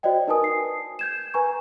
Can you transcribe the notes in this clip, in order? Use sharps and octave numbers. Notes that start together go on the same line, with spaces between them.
F#4 C5 D5 D#5 G5
D#4 A#4 B4 G#5 A5 D#6
C7
G6 G#6 E7
B4 G#5 A#5 C#6